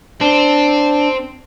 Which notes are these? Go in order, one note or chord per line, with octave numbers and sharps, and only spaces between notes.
C4 D4